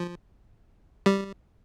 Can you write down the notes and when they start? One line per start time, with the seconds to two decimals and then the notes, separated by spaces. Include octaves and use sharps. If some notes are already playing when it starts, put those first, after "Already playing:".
Already playing: F3
1.06 G3